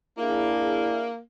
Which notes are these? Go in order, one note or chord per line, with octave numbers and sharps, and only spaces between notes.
A#3 D4 E4 G#4